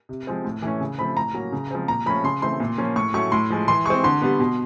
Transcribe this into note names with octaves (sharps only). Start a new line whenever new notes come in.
C3
F3 G#3 C4
A2
E3 A3 C#4
C#3
F3 A3 C4 B5
A2 A#5
F#3 A#3 C#4
C#3
F3 G#3 C4
A#2 A#5
F3 A3 C#4 B5
C#3 C6
E3 A3 C4 C6
A#2
F3 A#3 C#4
A2 C#6
F#3 A3 C#4 C#6
A2 C6
F3 G#3
E3 C6
G#3 C4 C#6
D3 C6
G3 B3
B2